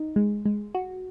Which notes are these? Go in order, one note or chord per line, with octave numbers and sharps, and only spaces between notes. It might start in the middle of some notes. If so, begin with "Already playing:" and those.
Already playing: D#4
G#3
G#3
F#4